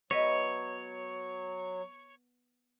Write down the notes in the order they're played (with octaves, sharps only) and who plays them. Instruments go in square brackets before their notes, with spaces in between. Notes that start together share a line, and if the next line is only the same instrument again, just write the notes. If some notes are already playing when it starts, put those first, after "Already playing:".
[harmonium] F#3 [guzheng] B3 D#5 E5 [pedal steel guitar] C#5